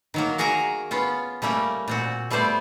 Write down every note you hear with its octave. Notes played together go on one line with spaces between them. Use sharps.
D#3 F#3 A#3
F#4 G#4 A#4 G#5 A#5
B3 C#4 F4
G3 A3 A#3 C#4
A#2 C4 F#4
G3 A3 B3 C5 D5